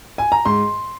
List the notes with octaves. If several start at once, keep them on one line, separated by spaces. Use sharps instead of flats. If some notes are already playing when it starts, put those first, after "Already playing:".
G#5
A#5
G#2 C6